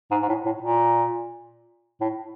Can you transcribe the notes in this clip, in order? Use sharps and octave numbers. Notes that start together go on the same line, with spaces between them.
G#2
G#2
A2
A2
A#2
A2